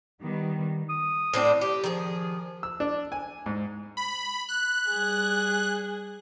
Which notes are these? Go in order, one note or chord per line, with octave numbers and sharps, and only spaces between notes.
D#3 G3 B3
D#6
A2 C4 D4
G4
D#3 F3 G#4
E6
D4
G#5
G#2
B5
F#6
G3 G#4